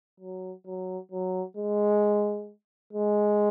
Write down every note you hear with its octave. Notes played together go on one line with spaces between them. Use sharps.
F#3
F#3
F#3
G#3
G#3